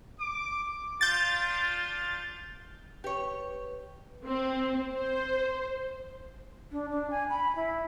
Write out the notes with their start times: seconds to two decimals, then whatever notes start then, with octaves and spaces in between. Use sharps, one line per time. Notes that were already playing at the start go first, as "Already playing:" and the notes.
0.20 D6
1.01 D4 F4 G6 A6
3.04 G4 B4 C#5
4.26 C4
4.95 C5
6.72 D4
6.91 D4
7.10 G#5
7.29 B5
7.55 E4